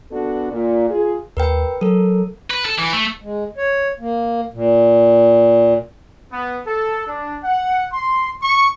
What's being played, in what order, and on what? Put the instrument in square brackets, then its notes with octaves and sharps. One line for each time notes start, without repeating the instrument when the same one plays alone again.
[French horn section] B3 D4 F#4 A4
A#2
F4 G#4
[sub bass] D#2 [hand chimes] A#4 B4 G5
[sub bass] F#3 [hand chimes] A4 A#4
[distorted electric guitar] B4
A4
E3
A3
[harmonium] G#3
C#5
A#3
A#2
[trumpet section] B3
A4
D4
F#5
C6
C#6